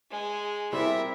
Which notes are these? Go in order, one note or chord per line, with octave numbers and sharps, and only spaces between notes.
G#3
G3 C4 E4 A#4 E5